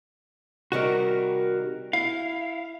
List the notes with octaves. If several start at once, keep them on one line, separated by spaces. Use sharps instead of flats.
C3 D#3 G3 F#4 A#4
E4 F5